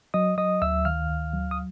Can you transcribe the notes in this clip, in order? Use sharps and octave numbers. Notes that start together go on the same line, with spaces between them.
F#3 D#5 D#6
F#3 D#5 D#6
D2 E5 E6
D#3 F5 F6
D2
F#3
D#6